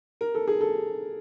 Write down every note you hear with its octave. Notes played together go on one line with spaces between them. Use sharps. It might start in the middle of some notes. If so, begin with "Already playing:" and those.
A#4
A4
G#4
A4